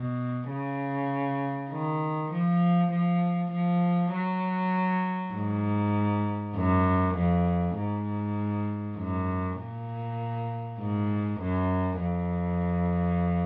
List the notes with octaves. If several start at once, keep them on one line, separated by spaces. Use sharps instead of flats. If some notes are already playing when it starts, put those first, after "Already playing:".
Already playing: B2
C#3
D#3
F3
F3
F3
F#3
G#2
F#2
F2
G#2
F#2
A#2
G#2
F#2
F2